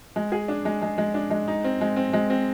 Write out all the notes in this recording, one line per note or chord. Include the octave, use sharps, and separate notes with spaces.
G#3
G#4
D4
G#3
G#3
G#3
D4
G#3
D#4
C4
G#3
C4
G#3
C4